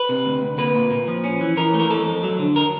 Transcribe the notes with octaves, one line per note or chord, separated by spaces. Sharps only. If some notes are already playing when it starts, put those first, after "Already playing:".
Already playing: B4
C3
D2
D2
A#3 B4
A#2
A#2
F3
C#4
E3
E3 A#4
A3
A#4
F2 A4
F2
F#3
D3
A#4